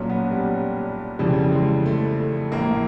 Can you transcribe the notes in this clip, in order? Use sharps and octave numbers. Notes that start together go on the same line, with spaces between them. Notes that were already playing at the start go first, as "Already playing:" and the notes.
Already playing: B1 A#2 F#3 C#4
B3
G3
F2 C#3 E3 G3
G#3
A3
A#1 A2 E3 A#3